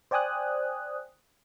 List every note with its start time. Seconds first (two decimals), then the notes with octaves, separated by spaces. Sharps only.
0.11 C5 D5 G5 G#5 D#6 F#6